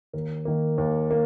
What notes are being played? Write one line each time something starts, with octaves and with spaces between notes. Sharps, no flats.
D#2 A#4
D#3 A#3
D#2
A#3